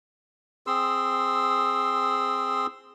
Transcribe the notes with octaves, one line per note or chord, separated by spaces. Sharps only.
C4 G#4 C6 E6